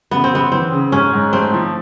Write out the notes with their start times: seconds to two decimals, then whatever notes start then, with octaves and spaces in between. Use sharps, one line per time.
0.11 C#3 B3
0.24 C4
0.32 C#3 B3
0.52 E3 C4
0.72 C#3
0.92 G#2 C#4
1.13 G#2
1.33 A3 C4
1.54 F3